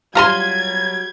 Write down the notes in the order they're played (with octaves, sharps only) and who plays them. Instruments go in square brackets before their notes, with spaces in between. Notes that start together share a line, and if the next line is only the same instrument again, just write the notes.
[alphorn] F#3 [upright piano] G3 D#7 [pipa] F4 A#5 C6 [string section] G#6